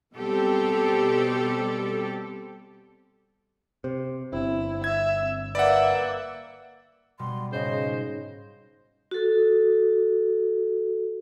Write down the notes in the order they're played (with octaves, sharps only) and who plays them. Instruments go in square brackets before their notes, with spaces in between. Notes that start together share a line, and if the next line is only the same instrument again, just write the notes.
[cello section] B2 G3 C4 G4 A4
[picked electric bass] C3 [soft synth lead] C5
[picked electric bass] G1 [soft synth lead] C4 [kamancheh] E4
[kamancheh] E5 [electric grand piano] G#6
[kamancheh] A#3 E5 [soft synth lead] B4 [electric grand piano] D5 F#5
[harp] B2 G3 [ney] C6
[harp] G#2 [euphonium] C#3 [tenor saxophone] C5 [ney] D#5
[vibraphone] F#4 A4